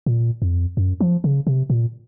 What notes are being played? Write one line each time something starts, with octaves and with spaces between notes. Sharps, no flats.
A#2
F2
F#2
F3
C#3
C3
A#2